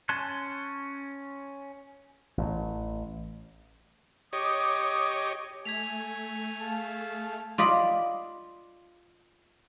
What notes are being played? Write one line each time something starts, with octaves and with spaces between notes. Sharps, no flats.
C#4 G#5 A5 C6 F#6
A1
G4 C#5 D#5 D6 D#6
A3 G#5 G#6 B6 F7
G#4 F5 A5
F4 D5 D#5 B5